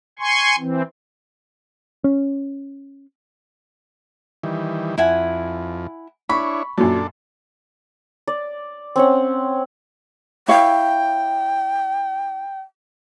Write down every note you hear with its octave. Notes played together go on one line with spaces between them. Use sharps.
G#5 C6 C#6
E3 C4
C#4
D#3 E3 G3
F2 E4 F#5 G#5
D4 E4 C#5 B5 C#6
F#2 A#2 F#3 D4 A4
D5
C4 C#4 F#5
E4 C#5 F5 G5